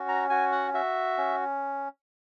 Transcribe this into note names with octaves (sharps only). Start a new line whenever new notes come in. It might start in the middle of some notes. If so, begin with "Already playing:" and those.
Already playing: C#4 F#4
A#5
F#4 G#5
F#5
F#4 E5
C#4